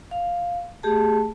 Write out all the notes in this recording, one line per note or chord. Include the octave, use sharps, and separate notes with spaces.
F5
A3 G4 G#4 A5